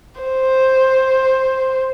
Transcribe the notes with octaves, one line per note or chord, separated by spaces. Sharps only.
C5